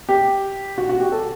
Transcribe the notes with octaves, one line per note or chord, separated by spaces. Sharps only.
G4
F#4
F#4
G4
A4